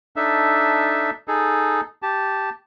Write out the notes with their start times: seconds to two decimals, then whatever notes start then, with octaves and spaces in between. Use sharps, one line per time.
0.16 D4 D#4 A4 E5
1.28 D#4 G#4 A4
2.02 G4 A5